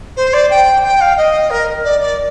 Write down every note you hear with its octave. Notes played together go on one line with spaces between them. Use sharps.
C5
D5
G5
G5
F5
D#5
A#4
D5
D5